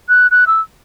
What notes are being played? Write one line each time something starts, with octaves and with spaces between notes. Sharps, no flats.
F#6
F#6
E6